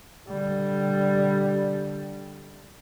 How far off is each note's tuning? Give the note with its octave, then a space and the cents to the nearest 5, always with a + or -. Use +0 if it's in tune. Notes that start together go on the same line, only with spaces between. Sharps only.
D3 +0 G3 +0